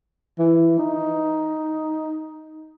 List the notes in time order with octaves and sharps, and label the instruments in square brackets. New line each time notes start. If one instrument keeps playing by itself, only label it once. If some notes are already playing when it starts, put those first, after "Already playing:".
[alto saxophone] E3
D#4